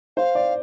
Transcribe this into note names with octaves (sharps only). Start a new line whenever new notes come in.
C5 F5
D5